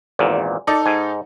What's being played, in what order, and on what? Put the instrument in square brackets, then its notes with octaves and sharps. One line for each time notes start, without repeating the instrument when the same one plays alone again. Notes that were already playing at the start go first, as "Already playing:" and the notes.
[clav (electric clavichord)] G#1 E2 A#2
[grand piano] D#4 A4 [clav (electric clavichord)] D5
[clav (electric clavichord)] G#2 G#5